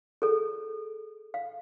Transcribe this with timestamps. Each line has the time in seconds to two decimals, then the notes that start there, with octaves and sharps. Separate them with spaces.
0.22 G#4 A4
1.34 F5